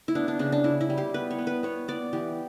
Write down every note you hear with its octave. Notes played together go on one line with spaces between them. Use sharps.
E4
B3 D4
D4
C#3 D4
D4
C#3 E4
E4
G3
G4
B3 B4
C#5
B3
B4
B3 C#5
B3 D5
E3 G4